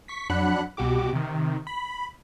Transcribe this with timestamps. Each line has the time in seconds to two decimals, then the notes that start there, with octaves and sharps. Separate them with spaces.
0.08 C#6 B6
0.30 F2 F#3 D4 F#5 B5 F#6
0.77 C2 B2 F#4 G4 D6
1.13 C3 D#3
1.67 B5